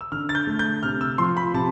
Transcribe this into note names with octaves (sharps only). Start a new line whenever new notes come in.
E6
D3 F6
A6
G6
A3
G6
C3 F6
E6
F3 C6
B5
C3 A5